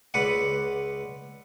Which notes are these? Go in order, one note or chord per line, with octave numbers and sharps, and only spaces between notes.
C#2 B4 D5 F#5